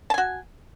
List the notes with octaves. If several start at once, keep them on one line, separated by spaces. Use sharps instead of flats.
F#4 G#5 A5